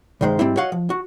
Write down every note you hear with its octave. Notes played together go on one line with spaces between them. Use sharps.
C2 G2 D#3 G#3 C5
G#2 G3 C4 E4
F#4 C#5 D#5 F5 F#5
F3
F#4